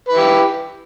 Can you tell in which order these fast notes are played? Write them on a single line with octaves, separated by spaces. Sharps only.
B4 E4 G4